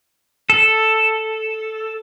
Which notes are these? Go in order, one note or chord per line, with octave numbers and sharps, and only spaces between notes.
A4